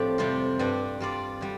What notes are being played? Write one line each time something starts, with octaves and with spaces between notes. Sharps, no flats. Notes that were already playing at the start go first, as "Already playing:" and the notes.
Already playing: A2 F3 A3 C4 D4 G4 A4 D5
F2 C3 G3 F4
G2 G3 D4
G3 F4 D5
D3 G3